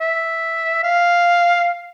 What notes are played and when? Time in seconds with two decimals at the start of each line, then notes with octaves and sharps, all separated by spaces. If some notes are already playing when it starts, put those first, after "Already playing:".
0.01 E5
0.84 F5